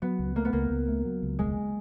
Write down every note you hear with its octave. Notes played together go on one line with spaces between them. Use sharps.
F#3 B3
C#2
A3 A#3
B3
C#2 A#3
C#2
A3
F#3
C#2
E1 G#3